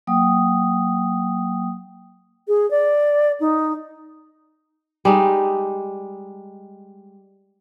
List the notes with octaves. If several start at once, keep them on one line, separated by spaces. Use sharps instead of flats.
F#3 A#3 G5 D#6
G#4
D5
D#4
G3 G#3 D#4